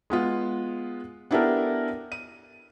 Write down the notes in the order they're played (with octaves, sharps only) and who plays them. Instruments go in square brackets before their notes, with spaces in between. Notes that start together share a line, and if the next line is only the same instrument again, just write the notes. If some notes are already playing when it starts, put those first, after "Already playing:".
[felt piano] G#3 B3 F4
B3 D4 E4 G4 A4 A#4
D#7